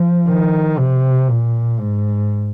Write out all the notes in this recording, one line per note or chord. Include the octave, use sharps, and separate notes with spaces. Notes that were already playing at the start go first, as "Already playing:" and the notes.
Already playing: F3
D#3
C3
A#2
G#2